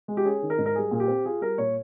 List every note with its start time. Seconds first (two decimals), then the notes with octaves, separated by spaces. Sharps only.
0.08 G#3
0.17 G4
0.25 C#4 G#4
0.42 D#3
0.50 A#4
0.58 G#2
0.66 A#4
0.75 G3 G#4
0.91 A#2
1.00 G4
1.08 C4
1.25 F4 G#4
1.41 G3 A#4
1.58 A#2 C#5